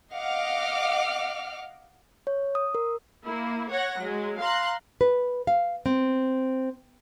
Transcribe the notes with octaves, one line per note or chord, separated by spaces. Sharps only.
D#5 F5 F#5 D6 F6
C#5
D#6
A#4
A#3 E4
C#5 F#5 A#6
F#3 G#3
F5 A#5 C6 F#6
B4
F5
C4